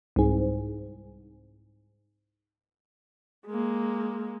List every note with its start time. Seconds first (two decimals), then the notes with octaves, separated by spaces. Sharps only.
0.16 C2 G#2
3.47 G#3 A#3